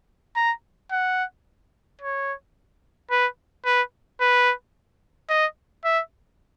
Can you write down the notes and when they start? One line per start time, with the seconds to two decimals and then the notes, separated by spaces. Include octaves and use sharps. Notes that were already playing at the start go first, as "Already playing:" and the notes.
0.36 A#5
0.92 F#5
2.01 C#5
3.11 B4
3.66 B4
4.21 B4
5.30 D#5
5.85 E5